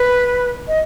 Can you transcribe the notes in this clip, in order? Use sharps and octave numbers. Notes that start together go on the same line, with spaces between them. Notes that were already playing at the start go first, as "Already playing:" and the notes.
Already playing: B4
D#5